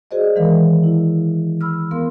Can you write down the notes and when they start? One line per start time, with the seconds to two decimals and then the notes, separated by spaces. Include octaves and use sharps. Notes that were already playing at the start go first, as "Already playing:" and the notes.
0.11 F#4 G#4 C5 D5 D#5
0.35 D#3 E3 G#3 A#4 F5
0.84 E4
1.61 B5 E6 F6
1.91 B3 A#4 F5 C6